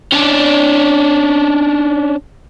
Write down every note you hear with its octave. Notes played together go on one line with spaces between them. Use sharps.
C#4 D4